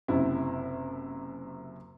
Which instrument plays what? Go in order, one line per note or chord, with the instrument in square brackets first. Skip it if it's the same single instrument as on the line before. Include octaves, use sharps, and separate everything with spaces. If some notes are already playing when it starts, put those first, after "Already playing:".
[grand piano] F#1 F#2 C3 E4